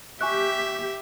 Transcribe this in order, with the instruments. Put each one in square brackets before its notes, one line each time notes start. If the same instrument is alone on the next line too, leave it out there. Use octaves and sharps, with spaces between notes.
[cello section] G4 [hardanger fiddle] E5 [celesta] G#5 C#6 F#6